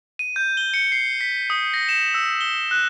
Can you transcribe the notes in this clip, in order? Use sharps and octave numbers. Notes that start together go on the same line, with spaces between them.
D#7
G6
G7
C#7
C7
B6
D#6
A#6
E7
E6
G7
F#6